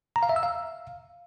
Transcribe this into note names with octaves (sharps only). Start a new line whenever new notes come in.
A#5
F5
E5
E6
F5